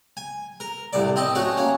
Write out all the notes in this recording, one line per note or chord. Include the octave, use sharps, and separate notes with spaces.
G#5
A#4
C2 A2 D5
C4 D#5 A5
A3 C#4 F#4
A#3 C#4